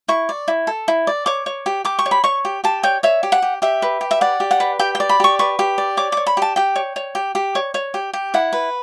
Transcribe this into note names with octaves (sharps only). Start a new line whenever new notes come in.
E4 C#6
D5
E4
A4
E4
D5
C#5 D6
C#5
G4
G4 D6
C#6
C#5
B5
C#5 C#6
G4
G4 A5
C#5 G5
C#5 E5
G4
F#5
G4
G4 E5
B4
G4
E5
D5 F#5
G4
F#5
B4
G4 G5
G5
D5
B5
G4 C#6
B4 C#6
G4
D5
C#5 D6
C#5 D6
B5
G4 A5
G4 G5
C#5
C#5
G4
G4
C#5
C#5
G4
G4
E4 F#5
B4